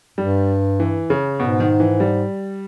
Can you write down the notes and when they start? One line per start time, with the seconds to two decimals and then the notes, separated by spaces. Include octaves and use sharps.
0.18 G2 G3
0.80 E3
1.10 C#3
1.40 G#2 B2
1.60 D#3
1.80 E3
2.00 G3